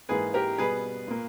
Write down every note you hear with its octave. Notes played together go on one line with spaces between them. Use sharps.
G#2 E3 A#3 G#4 B4
G4 A#4
B2 G3 B3 G#4 B4
A#2 A#3